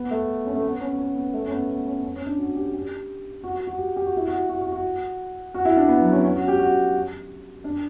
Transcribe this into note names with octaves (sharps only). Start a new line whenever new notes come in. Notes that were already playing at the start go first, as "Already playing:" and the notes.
Already playing: B3
A3
C#4
A3
B3
C#4
C#4
B3
A3
C#4
B3
B3
C#4
C#4
C#4
D4
F#4
G4
G4
F#4
F#4
F#4
G4
G4
F#4
E4
F#4
F#4
F#4
F#4
F#4
E4
D4
B3
F#3
C#4
C#4
F#4
G4
F#4
D4